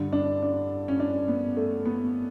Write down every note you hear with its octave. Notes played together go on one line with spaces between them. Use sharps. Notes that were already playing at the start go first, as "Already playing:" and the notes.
Already playing: G2 D3
D4
D4
C#4
D4
B3
A3
B3